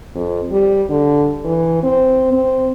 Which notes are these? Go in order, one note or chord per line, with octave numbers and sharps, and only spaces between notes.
F2
G3
D3
E3
C4
C4